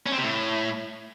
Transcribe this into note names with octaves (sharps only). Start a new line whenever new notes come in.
C#4
C4
C3
A2